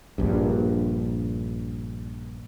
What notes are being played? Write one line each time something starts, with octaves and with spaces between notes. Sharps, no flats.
A#1 G2